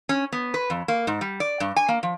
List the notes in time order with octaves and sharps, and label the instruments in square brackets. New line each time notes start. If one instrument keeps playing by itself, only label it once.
[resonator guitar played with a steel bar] C#4
B3
B4
F2
A#3
G#2
G3
D5
G2
G#5
A#3
F3